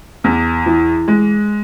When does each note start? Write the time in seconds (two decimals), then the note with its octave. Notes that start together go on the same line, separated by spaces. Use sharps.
0.24 E2
0.66 E3
1.08 G#3